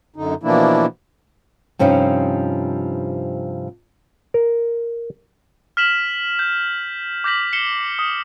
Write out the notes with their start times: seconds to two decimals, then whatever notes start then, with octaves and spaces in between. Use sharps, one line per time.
0.16 F#2 D3 D#4
0.43 B2 E3 F3 A#3 D4 E4
1.79 G2 C3 F3 C#4 D#4
4.34 A#4
5.77 F6 B6 E7 F#7
6.39 G6
7.24 D6 G6 A#6 B6 F#7
7.53 C7 C#7 E7 G7
7.99 D#6